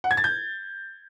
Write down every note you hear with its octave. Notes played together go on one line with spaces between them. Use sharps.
F#5
G#6
A6
G6